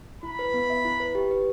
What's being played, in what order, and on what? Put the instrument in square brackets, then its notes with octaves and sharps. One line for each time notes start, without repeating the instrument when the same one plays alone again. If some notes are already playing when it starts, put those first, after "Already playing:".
[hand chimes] E4 [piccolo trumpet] B5
[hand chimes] B4
B3
E5
E4
B4
G4
B4